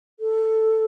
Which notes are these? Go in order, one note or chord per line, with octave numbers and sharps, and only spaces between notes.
A4